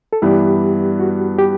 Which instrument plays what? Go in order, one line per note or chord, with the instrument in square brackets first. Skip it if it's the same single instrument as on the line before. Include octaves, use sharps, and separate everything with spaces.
[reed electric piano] A4
[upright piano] G2 E3 G3 B3 [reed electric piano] G4
[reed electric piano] F#4
G4